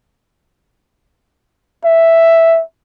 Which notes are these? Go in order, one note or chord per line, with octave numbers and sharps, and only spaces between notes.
E5